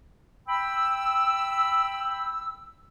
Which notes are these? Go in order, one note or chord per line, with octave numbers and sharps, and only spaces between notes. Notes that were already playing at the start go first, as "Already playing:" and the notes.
G5 B5 E6